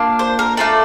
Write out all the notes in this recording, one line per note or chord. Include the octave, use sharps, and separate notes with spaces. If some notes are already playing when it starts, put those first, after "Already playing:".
Already playing: A#3 D4 F4
C5
A#4
A3 D4 F4 A4 D5